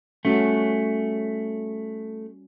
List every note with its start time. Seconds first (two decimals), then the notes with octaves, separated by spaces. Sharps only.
0.25 G3 A3 C#4 F#4